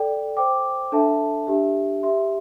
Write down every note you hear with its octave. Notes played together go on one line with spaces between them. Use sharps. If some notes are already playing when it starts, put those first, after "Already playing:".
Already playing: A4 D5 G5
C5 G5 D6
D4 A4 E5 A5
D4 G4 E5
G4 E5 C6